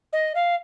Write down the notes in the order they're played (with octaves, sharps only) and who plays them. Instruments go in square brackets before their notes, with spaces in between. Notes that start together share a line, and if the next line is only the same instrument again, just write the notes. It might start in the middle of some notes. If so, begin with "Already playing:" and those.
[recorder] D#5
F5